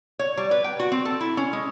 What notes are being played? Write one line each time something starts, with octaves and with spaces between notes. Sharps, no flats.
C#5
G3
B4
G5
F#4
C4
A4
E4
C#4
G#3